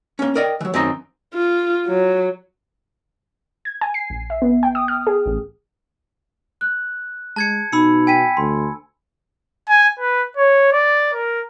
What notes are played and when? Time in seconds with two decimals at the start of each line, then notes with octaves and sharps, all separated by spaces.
0.19 A#3 C#4
0.35 A#4 D5 D#5 G5
0.61 E3 F#3
0.74 F#2 D#3 C4 D#5 A#5
1.34 F4
1.86 F#3
3.65 G#6
3.81 G#5
3.94 C7
4.10 A#1
4.30 E5
4.42 B3
4.63 G5
4.75 D#6
4.88 F6
5.07 G#4
5.26 A1
6.61 F#6
7.36 G#3 A5 G#6 C#7
7.72 B2 D#4 B5 E6 C#7
8.07 G5 G#5 B6 D#7
8.37 D2 C6
9.69 G#5
9.99 B4
10.37 C#5
10.72 D5
11.13 A#4